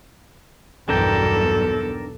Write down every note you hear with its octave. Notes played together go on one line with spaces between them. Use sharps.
B1 E2 G2 D4 A4 A#4 G5